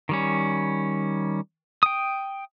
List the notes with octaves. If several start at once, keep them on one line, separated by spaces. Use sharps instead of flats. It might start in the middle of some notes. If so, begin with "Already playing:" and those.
D#3 G3 C#4
G5 D#6